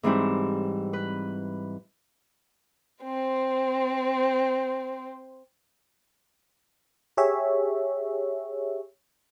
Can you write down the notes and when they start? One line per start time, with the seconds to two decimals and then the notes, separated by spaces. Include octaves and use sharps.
0.03 G#2 E3 G3 C4 E4
0.93 B4
3.04 C4 C5
7.17 G4 G#4 C#5 E5